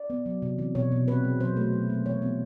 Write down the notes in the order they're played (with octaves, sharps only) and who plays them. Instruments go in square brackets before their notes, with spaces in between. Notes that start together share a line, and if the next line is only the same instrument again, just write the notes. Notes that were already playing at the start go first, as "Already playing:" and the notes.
Already playing: [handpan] D5
B3
F#3
C3
E3
B2 C#5
B2
C4 B4
G#3
F#3 C5
A3
F#3
A#3
E3 C#5
B3